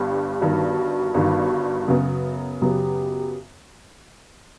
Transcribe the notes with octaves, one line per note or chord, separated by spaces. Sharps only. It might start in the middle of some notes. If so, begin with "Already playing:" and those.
Already playing: G1 G2 G4
G1 G2 D#3 F#4
G1 G2 D#3
F#2 C#3 F#3 B3
F#2 C#3 F#3 B3 G4